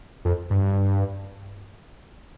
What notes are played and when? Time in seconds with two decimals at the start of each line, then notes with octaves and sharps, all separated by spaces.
0.25 F2
0.50 G2